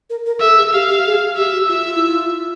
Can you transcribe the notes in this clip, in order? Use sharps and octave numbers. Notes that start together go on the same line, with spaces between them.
A#4
A#4
A4 E5
G#4
G4 F5
G4
G#4
G4 E5
F#4
F4 E5
F4
E4
F4